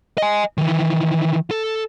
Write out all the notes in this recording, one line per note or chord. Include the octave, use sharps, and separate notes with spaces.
D#5 G#5
D#3 E3
A4